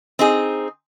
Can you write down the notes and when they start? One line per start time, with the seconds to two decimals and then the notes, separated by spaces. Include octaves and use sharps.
0.19 C4 D#4 G#4